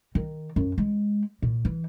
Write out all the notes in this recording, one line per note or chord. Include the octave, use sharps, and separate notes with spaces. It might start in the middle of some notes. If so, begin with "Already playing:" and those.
D#3
F#2
G#3
A#2
E3